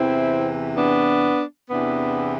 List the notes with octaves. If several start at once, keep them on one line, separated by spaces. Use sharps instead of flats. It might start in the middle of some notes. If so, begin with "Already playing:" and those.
Already playing: E2 C3 E3 C4 E4
B3 D4
E2 C3 E3 B3 D4